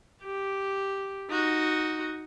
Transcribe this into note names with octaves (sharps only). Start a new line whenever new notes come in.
G4
D#4 F#4